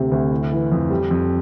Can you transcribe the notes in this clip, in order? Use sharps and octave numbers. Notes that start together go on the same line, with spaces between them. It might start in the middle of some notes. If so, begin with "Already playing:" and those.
Already playing: D2 C3
D2
E4
E3
F2
G3
F2